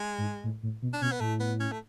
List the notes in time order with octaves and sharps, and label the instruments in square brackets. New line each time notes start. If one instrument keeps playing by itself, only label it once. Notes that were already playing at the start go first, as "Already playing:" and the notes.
Already playing: [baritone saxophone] G#3
[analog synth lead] G#2
A2
A2
B2
[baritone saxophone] D4
[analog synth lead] B2 [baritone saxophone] C#4
[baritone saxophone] B3
[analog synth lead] A2 [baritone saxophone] A3
[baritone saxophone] B3
C#4
A3